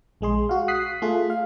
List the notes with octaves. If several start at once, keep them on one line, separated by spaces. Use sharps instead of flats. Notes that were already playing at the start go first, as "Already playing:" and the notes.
A#1 G#3 G#4 C6
F#4 F5
D#6 F#6 B6 C7
A3 F4 G#4
F5